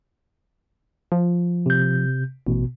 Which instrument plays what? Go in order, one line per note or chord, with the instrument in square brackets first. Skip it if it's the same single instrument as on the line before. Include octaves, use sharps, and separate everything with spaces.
[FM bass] F3
[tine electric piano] C3 G6
[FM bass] A1 [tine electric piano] B2